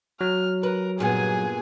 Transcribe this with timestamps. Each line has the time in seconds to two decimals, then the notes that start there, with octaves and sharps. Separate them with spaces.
0.21 F#3 F6
0.63 A#4 B4
0.99 G2 A#2 B3 G#4 G#5